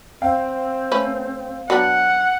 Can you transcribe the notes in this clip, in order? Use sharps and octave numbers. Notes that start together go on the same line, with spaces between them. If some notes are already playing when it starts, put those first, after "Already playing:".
C4 F5 G5
A3 C#4 B4
F#3 B3 D4 F#5